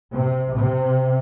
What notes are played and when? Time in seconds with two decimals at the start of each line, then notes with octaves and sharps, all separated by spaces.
0.14 C3
0.57 C3